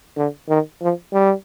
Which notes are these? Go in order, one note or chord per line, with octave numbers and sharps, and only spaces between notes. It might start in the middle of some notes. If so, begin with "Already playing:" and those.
D3
D#3
F3
G3